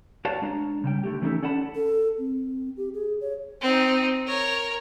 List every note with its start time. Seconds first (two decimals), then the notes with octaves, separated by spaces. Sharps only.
0.25 F#4 B4 C#5 D5 F5 A5
0.42 G#3 D4 A#5
0.84 C#3 G3 G5
1.03 D3 A3 G4
1.22 E3 G3 C#4 D#4 E4 A4
1.43 C#4 A4 D5 F#5 A5 B5
1.75 A4
2.18 C4
2.77 G4
2.94 G#4
3.21 C#5
3.61 C4 D#4
4.27 A#4 C#5